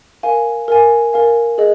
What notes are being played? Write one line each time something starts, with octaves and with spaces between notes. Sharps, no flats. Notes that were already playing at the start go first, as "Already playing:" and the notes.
A#4 F5 G#5
A#4 F5 G#5
A#4 F5 G#5
G#4 D#5